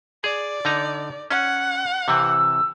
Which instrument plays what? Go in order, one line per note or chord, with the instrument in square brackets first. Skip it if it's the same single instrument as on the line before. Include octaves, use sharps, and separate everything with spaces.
[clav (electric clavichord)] G#4 [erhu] D5
[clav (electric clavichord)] D3 D#4 A#5
[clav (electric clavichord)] C#4 [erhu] F#5
[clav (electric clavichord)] C3 E3 C4 [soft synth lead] E6